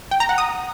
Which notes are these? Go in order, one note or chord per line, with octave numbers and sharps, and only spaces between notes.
G5
A#5
F#5
D#6